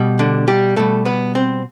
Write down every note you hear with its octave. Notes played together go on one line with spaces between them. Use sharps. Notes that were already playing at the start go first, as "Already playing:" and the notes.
Already playing: B2 G3
D3 D4
G3 G4
B2 G3 A3 A4
B3 B4
C4 C5